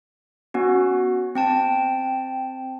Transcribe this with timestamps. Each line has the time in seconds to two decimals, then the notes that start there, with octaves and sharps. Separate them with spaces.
0.54 B3 C#4 F#4
1.35 C4 G5 A5